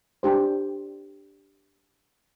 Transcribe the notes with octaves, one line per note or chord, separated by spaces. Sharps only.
D4 G4 C5